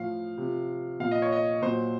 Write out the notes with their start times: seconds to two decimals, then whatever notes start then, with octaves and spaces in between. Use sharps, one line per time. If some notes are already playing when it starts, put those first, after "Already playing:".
Already playing: A2 F3 F5
0.38 C3 F3
1.00 A#2 F3 F5
1.11 D#5
1.22 C#5
1.32 D#5
1.62 A#2 F#3 C5